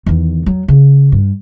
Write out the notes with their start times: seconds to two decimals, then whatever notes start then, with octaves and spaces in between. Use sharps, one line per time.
0.06 E2 D#3
0.46 F#3
0.68 C#3
1.12 G2